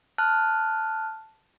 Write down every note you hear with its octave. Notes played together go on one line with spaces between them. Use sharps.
A5 F6 F#6